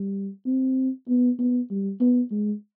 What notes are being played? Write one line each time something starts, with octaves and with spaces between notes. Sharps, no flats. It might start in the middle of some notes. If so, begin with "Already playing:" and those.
Already playing: G3
C4
B3
B3
G3
B3
G#3